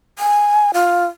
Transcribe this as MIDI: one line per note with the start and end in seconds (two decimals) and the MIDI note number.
0.19 0.71 80
0.74 1.05 65